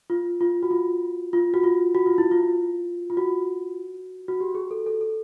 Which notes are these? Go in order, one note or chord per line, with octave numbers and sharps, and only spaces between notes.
F4
F4
F#4
F4
F4
F#4
F4
F#4
F4
E4
F4
F4
F#4
F#4
G4
G#4
A4
A4
A4